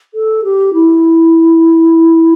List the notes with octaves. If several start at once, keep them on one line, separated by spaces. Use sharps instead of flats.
A4
G4
E4